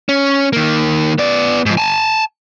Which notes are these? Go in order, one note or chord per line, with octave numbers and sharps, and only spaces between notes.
C#4
D#3 A#3
B3 D5
G#2 F3
G#5 A5